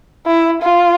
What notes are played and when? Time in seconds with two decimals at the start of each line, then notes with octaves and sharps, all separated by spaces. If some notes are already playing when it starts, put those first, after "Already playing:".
0.26 E4
0.61 F4